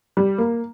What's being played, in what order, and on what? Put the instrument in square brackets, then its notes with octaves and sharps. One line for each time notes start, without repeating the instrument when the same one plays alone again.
[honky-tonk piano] G3
A#3